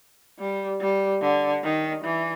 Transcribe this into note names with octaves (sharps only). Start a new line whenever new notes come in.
G3
G3
D3
D#3
E3